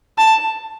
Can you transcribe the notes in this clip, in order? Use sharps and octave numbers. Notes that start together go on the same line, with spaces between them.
A5